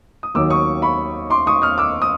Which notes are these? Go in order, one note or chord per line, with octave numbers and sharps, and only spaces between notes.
D#6
D#2 D#3 F#3 D6 E6
C#6 D#6
B5 C#6
C6 D6
C#6 D#6
D#6 F6
D6 E6
D#6